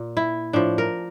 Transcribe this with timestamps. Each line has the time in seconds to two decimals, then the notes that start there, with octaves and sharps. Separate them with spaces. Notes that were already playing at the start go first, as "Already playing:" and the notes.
Already playing: A#2
0.17 E4
0.53 A2 F3 D4
0.78 A#4